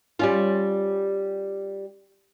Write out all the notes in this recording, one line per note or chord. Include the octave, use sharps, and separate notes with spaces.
G3 C#4 F4